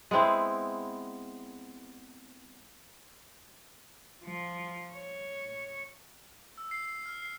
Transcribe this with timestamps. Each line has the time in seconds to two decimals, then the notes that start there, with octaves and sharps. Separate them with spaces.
0.11 G#3 B3 C4 E4
4.24 F3
4.93 C#5
6.58 E6
6.71 C7
6.85 C7
7.06 F6
7.22 C7